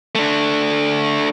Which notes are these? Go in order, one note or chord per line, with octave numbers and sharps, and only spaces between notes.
A3 D4